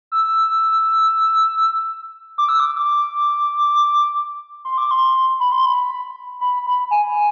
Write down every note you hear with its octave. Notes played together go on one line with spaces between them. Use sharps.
E6
D6
E6
D6
D6
C6
D6
C6
B5
C6
B5
B5
B5
G#5